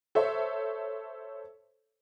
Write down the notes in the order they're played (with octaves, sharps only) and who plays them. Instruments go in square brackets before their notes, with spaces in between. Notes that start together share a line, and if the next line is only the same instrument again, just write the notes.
[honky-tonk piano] A4 C5 C#5 E5